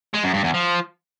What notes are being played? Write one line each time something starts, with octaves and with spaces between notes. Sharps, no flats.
G#3
F#2
G2
E2
F3